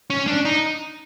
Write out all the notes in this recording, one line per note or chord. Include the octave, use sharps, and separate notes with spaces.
C#4
D4
D#4